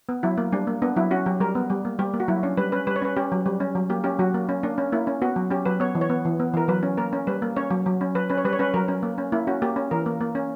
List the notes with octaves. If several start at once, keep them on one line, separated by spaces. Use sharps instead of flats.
B3
F#3 E4
A#3
G3 D4
A#3
B3 D4
F#3 E4
C#4 F#4
F#3 G4
G3 A#4
B3
G3
A#3
G3 G4
A#3
F#4
F#3 E4
C#4 D4
G3 B4
C#4 B4
G3 B4
C#5
C#4 B4
C#4 G4
F#3
G3
C#4
F#3
A#3 G4
C#4 G4
F#3 F#4
A#3
C#4
A#3 D4
C#4
A#3 E4
C#4
B3 F#4
F#3
C#4 G4
F#3 B4
B3 C#5
E3
C#5
B3
E3
B3
E3 A#4
F#3 B4
C#4
A#3 A#4
C#4
G3 B4
A#3
C#4 C#5
F#3
F#3
C#4
F#3 B4
C#4 B4
C#5
G3 B4
C#5
C#4 B4
F#3 A#4
C#4
A#3
C#4
A#3 E4
C#4 F#4
A#3 G4
C#4
E3 A#4
A#3
A#3
C#4